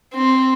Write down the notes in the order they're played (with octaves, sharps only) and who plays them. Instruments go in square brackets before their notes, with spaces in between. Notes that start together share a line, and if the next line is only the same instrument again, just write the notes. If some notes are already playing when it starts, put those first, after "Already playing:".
[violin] C4